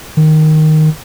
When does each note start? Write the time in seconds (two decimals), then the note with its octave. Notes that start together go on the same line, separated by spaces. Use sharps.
0.17 D#3